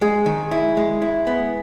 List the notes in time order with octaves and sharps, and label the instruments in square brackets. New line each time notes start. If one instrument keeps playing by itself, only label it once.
[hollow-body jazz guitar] G#3 [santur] G#4
[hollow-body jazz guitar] D#3
E4
G#3
E4
B3